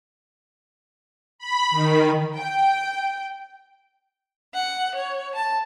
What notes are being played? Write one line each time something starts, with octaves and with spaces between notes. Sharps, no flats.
B5
D#3
G5
F#5
C#5
A5